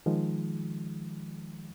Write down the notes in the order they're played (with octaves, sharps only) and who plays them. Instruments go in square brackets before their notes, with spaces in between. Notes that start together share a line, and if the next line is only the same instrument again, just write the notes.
[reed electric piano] D#3 F3 G#3